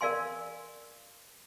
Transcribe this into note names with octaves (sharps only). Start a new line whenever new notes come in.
A#4 D5 F5 G#5 C6